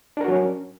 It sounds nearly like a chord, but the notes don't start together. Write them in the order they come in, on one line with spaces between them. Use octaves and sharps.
D4 A#4 F#4 F#3 C#4